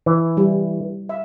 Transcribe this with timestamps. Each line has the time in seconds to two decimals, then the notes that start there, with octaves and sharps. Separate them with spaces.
0.06 E3
0.37 G3 E4 G4
1.09 E5 F5